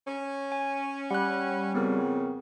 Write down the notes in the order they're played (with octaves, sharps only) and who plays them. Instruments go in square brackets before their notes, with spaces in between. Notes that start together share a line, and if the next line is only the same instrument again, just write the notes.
[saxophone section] C#4
[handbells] G#5
[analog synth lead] G3 [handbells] F#5 B5 F#6
[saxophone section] F2 C#3 [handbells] B3 C4 A#4